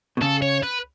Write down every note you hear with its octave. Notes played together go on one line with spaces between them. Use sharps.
B2
C#3 A4
C#5
B4